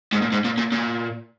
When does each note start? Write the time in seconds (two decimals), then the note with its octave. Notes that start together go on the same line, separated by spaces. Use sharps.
0.13 G#2
0.22 A#2
0.32 G#2
0.45 A#2
0.58 A#2
0.72 A#2